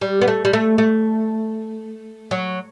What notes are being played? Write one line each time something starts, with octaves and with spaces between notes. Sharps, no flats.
G3
B3
A3
G3
A3
A3
F#3